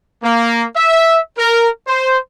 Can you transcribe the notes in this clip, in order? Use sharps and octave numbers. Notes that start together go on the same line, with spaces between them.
A#3
E5
A#4
C5